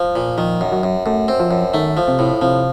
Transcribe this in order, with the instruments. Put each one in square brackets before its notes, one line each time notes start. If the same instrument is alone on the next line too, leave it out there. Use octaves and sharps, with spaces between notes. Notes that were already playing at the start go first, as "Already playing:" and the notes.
Already playing: [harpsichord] F3
A#2
[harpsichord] D#3 [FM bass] F3
[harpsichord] F#2
[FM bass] F#3
[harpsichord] F#2
[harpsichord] F#2 [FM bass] A3
[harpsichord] C4
[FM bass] F3
[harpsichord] F#2
[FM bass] D#3 [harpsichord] A3
[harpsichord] F3
[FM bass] C3
[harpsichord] A2
[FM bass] C3 [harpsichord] F3